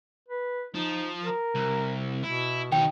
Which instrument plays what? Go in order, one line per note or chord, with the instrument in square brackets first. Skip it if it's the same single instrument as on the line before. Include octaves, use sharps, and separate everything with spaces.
[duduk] B4
[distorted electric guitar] F3 [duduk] D#4
[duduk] A#4
[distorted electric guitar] C2
[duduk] B2 [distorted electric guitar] E4
[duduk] B2 [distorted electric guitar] D#3 C#5 [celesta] G5